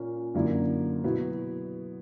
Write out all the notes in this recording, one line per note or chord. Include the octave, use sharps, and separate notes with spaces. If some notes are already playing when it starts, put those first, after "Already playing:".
Already playing: A#2 A#3 C#4
F#2 D3 A#3 E4
B2 F#3 B3 E4